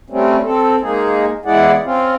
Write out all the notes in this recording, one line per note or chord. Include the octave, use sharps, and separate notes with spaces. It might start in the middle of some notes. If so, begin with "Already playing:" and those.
G3 A3 C4 C#4
C4 A4
G#3 A#3 D#4 G#4
E2 G#3 E4 G#4 D5 F#5
C4 C#4 F4